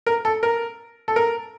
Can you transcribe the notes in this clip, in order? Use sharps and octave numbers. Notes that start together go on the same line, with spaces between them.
A#4
A4
A#4
A4
A#4